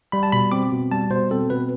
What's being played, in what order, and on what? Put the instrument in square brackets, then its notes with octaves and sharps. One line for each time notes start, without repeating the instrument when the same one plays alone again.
[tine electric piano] G3 B5
A5
B2 B5
C4 D6
B2
G3 A5
B2 C5
C4 A4
B2 B4